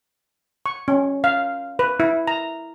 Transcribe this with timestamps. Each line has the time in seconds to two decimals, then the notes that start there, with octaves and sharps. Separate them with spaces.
0.66 C#6
0.88 C#4
1.24 F5
1.79 B4
2.00 E4
2.28 A#5